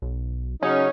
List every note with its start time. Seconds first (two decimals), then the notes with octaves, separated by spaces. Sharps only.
0.02 B1
0.63 C#3 F#3 C#4 D#4